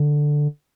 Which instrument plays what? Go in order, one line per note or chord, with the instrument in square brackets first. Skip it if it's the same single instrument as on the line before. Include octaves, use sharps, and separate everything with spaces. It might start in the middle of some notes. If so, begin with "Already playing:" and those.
Already playing: [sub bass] D3